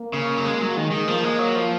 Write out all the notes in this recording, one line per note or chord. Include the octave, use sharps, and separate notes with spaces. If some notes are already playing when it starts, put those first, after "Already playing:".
Already playing: A#3
C#3
F#3
G#3
F#3
D#3 G#3
D#3
F3 A#3
G#3
F#3
F3